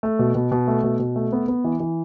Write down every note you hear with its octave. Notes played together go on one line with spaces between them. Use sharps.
A3
B2
B2
B2
A3
B2
B2
A3
B3
B3
E3
E3